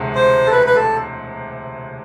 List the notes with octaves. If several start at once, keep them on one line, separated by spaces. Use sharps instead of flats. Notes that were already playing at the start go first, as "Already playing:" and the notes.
Already playing: E1 D2 C3 G#3
C5
A4
B4
B4
A4